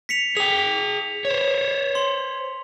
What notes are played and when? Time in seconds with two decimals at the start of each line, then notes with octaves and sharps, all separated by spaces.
0.09 B6 C#7 F7
0.37 G#4 G5 F7
1.25 C5 C#5
1.95 C6